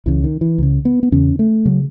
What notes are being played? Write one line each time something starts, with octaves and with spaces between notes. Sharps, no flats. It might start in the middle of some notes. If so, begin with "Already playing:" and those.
C#2 C#3 E3
D#3
E3
C#2 C#3
B3
B3
E2 C#3 C#4
A3
C#3 F#3